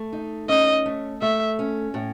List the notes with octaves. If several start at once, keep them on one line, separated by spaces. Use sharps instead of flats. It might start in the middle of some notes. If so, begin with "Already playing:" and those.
Already playing: A3
D#4
C#4 D#5
A3
A3 E5
C#4
A2